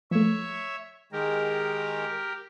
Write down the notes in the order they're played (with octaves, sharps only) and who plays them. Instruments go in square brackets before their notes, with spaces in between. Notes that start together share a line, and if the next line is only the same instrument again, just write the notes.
[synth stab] F3 A3 [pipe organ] C#5 E5
[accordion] D#3 G#3 [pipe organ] G4 A#4